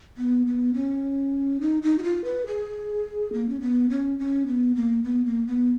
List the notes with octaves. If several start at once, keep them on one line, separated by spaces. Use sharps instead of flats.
B3
B3
C#4
D#4
D#4
F#4
F4
B4
G#4
A#3
C#4
B3
C#4
C#4
B3
A#3
B3
A#3
B3